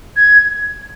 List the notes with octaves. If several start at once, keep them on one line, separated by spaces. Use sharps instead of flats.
G#6